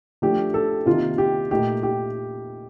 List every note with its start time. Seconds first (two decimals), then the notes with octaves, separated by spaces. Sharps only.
0.22 F3 A3 D4 G4
0.54 A4
0.86 C3 D#3 A#3 D#4 F4
1.18 G4
1.51 A#2 A3 D#4 G4
1.83 G4